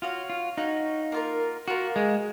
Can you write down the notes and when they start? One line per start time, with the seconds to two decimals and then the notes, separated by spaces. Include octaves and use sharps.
0.02 F4 F#4 C#5 F5
0.30 F4
0.57 D#4 F#4 C#5 F5
1.12 A#3 F4 A#4
1.68 A#3 F4 F#4 A#4
1.96 G#3